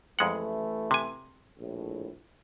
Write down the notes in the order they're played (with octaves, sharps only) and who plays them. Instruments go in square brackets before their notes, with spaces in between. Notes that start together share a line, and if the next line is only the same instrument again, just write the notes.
[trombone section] A1 E3 A3 [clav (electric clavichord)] F2 G#3 F#5
[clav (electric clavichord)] C3 G#5
[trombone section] A#1 A2